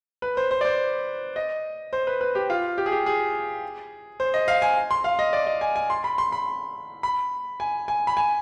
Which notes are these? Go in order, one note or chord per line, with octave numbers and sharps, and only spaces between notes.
B4
C5
C5
D5
C5
D#5
C5
B4
B4
G4
F4
G4
G#4
G4
G#4
C5
D#5
F5
G#5
C6
F5
D#5
D5
D#5
G#5
G#5
C6
B5
C6
B5
B5
G#5
G#5
B5
G#5